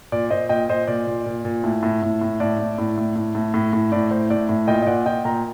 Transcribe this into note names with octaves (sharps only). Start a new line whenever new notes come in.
A#2 D5
A#2 C5 D#5
A#2 D#5 G5
A#2 C5 D#5
A#2 D5
A#2
A#2
A#2
A2
A2
A2
A2
A2 D5
A2
A2
A2
A2
A2
A2
A2
A2 D5
A2 C5
A2 D5
A2
A#2 D#5 G5
D#5
A#2 D5 F#5
A#2 D#5 G5
A#2 G5 A#5